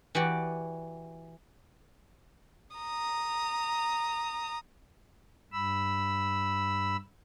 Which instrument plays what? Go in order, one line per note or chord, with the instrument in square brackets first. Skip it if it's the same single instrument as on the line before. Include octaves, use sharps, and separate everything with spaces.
[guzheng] E3 F#4 G4 D5
[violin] A#5 D#6
[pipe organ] G2 B5 E6